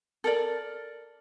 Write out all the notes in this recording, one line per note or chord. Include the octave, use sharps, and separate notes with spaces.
A4 A#4 D5